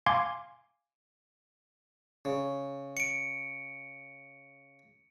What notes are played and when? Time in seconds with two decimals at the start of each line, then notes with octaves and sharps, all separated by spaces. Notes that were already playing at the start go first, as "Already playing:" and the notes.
0.06 F5 G#5 C6 D6 G#6
2.25 C#3
2.97 C#7 D7